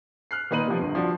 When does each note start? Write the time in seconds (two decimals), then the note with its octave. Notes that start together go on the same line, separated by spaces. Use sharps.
0.31 F6 F#6 C7
0.51 A#2 D#3 D#4 B4 D#7 F#7
0.67 C3 F3
0.81 G1
0.95 F3 D4 F#4